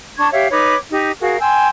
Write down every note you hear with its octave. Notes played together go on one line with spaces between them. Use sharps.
D4 A5 C#6 G#6
G4 C#5 E5 F5
D#4 B4 C#5 D6
D#4 G4
F#4 G#4 A#4 F5
G5 G#5 C6 E6